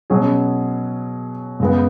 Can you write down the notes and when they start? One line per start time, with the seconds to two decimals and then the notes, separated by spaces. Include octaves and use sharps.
0.10 B2 F#3 C#4 G#4
1.60 F#2 C#3 G#3 B3